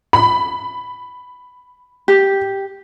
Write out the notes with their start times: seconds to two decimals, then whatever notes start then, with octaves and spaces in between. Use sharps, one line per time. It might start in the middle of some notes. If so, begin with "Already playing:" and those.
0.13 B5
2.08 G4